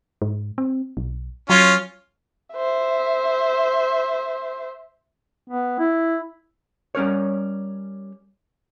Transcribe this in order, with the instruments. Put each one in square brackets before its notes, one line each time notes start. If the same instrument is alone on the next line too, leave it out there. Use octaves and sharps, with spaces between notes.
[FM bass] G#2
C4
B1
[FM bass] F#3 [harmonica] C#4 F4
[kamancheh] C5 E5
[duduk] B3
E4
[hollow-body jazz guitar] G3 C#4 A#4 C#5